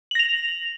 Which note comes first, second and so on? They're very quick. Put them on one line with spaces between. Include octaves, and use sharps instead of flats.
F#7 A#6 F7